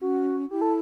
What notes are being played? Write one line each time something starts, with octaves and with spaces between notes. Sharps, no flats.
C#4 F#4
E4 G4
A4